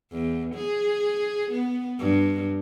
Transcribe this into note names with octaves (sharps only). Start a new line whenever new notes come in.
E2
G#4
B3
G2